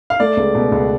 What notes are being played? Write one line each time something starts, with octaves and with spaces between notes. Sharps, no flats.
F5
A3 D5
C#2
B2
C#2